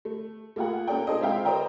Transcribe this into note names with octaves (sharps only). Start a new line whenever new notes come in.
A3
A3 A#3 F4 G#4 F#5
A#3 C#4 A4 A#4 D5 G5
D4 D#4 G#4 A4 C5 D#5
G#3 C4 F4 E5 F5 G5
B4 C5 D5 D#5 G5 A#5